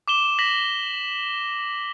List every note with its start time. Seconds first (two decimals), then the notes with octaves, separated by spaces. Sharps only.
0.08 D6 E7 G7
0.39 A#6 B6 F#7